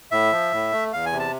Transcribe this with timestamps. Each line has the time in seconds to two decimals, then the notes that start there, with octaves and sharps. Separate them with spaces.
0.12 A2 E5
0.32 F3
0.52 A2
0.72 A3
0.92 E2 F5
1.06 G#5
1.13 C3
1.19 A5